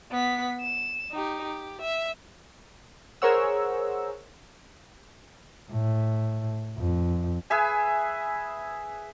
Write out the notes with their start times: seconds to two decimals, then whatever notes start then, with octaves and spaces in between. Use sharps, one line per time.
0.11 B3 B6
0.61 E7
1.12 D#4 G4
1.44 G4
1.82 E5
3.22 G#4 A#4 C5 C#5 F#5 E6
5.71 A2
6.78 F2
7.50 G#4 B4 E5 G#5